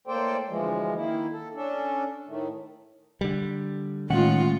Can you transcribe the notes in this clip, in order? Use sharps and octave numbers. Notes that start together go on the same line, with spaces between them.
A2 A#3 A4 C5 D5 G5
D2 E3 F3 G#3
D#3 A#3 E4
A4
C#4 D4 A4
A2 D#3 A3
D3 G3
A2 D#3 G#3 C#4 F4 F#5